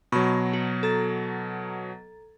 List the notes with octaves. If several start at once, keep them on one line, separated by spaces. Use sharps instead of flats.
B2 F#3 B5 C#6
F#4
A4 A#5 A6